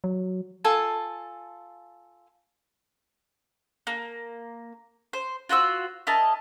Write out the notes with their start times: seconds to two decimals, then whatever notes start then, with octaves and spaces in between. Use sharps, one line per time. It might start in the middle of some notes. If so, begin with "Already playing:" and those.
0.04 F#3
0.64 F4 A4 G#5 A5
3.87 A#3
5.13 C5
5.49 F4 F#4 C5 E6
6.07 E4 A#4 D#5 A5